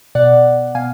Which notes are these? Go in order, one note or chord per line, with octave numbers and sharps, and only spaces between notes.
B2 D5 F#5
B2 F5 G#5